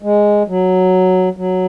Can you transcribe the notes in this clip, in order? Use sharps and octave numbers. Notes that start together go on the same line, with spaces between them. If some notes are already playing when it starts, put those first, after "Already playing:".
G#3
F#3
F#3